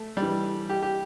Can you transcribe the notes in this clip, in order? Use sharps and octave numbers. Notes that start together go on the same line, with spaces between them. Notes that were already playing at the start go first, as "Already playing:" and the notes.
Already playing: A3
G3
E3
G4
G4